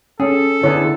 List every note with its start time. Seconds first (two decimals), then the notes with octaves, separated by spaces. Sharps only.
0.20 C#4 G#4 A4
0.63 D3 B3 E4 G#4 C#5